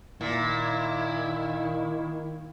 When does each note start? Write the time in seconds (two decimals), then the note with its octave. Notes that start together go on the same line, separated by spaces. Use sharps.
0.21 A#2 D#3 E4